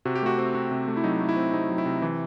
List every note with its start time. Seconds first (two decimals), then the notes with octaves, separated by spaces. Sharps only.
0.05 C3 F#4
0.15 G4
0.22 A3 F#4
0.38 C4
0.55 C3 F#4
0.71 C3
0.88 A3
0.97 E4
1.04 F#3 D#4
1.21 A3
1.29 E4
1.37 C4
1.53 C3 D#4
1.70 F#3
1.78 E4
1.86 C3
2.02 E3